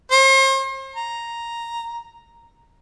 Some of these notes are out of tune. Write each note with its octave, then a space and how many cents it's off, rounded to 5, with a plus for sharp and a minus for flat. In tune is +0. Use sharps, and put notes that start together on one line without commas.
C5 +40
A#5 +0